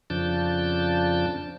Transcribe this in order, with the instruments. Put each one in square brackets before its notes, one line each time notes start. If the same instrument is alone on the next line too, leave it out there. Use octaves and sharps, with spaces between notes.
[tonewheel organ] F2 C#3 F3 D4 A5 G6